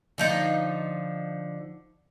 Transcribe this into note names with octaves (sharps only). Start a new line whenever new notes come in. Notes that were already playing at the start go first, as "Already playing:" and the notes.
D3 F3 D#4